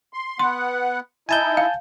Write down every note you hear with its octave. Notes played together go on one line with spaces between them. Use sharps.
C6
B3 F#5 C6
D#4 E4 G#5 A5 G6
F5